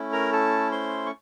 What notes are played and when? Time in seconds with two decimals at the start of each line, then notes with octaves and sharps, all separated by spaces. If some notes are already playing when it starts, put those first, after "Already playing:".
Already playing: A3 C#4 E4
0.13 A#4 A#5
0.33 A4 A5
0.72 C5 C6
1.06 C#6